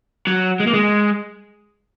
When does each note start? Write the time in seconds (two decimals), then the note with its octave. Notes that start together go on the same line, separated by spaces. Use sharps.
0.27 F#3
0.60 G#3
0.67 A#3
0.74 G#3